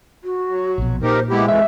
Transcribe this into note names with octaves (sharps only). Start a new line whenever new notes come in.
F#4
F#3
A#1 B2
A#2 D#4 G4 A#4 C5
G#3 B3 E4 G4
F2 E3 A3 E5